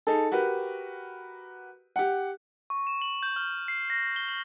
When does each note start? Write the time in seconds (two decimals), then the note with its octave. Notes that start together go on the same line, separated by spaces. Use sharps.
0.07 D#4 G#4 A4
0.31 F#4 G4 A#4 B4
1.96 G4 F#5
2.70 C#6
2.87 E7
3.02 F#7
3.23 G6
3.36 F6
3.68 C7
3.90 A#6
4.16 G7
4.28 F#7